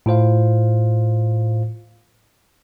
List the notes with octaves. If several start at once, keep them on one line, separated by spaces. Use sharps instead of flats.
A2 F4 C5 F5